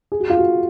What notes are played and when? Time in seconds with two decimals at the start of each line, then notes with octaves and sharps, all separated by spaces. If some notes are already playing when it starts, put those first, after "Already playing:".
0.12 G#4
0.20 F#4
0.30 F4
0.38 F#4